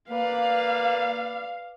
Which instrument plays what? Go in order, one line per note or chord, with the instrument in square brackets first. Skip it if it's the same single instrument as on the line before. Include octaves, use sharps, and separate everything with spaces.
[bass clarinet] A#3 [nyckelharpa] B4 D5 [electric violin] F5